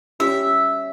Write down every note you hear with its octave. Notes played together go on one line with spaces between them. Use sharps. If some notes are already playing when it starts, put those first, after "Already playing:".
G3 C#4 G4 E5